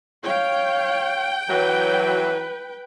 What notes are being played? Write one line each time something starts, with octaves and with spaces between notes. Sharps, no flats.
C#5 F5 G5
E3 F#3 B4